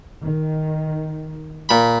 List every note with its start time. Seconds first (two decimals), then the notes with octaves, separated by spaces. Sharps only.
0.24 D#3
1.69 A#2 B5